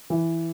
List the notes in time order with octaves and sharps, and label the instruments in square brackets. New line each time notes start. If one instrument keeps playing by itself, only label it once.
[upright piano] E3